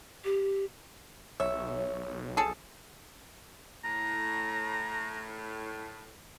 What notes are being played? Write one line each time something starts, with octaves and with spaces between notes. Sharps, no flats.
G4
B1 C#5 E5
G#4 A4 A5
A2 A#5